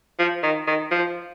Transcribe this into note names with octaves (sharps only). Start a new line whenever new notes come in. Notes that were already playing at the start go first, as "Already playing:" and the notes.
F3
D#3
D#3
F3